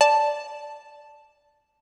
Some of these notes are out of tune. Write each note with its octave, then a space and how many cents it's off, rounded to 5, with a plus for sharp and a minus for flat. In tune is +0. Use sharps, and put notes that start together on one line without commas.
D5 +0 A5 +0